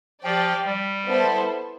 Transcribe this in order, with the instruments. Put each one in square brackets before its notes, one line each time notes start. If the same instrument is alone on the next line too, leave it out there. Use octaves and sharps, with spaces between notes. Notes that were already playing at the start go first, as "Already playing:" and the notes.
[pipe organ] F3 [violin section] G4 D5 G5
[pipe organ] G3
[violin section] B3 E4 A4 C5